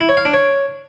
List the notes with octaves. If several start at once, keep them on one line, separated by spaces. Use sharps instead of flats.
E4
C#5
F5
D4
C#5